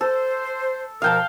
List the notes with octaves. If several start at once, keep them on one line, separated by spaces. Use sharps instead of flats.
A4 C5
B2 F3 A#4 F5 G5 A5